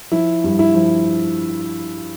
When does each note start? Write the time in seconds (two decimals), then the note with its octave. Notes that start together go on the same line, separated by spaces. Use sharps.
0.11 F3 E4
0.44 G2
0.59 E4
0.75 F3